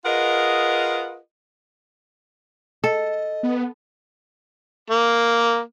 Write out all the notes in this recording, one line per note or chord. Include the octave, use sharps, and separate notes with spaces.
F4 G#4 A#4 B4 D#5 F#5
A4 D#5
B3
A#3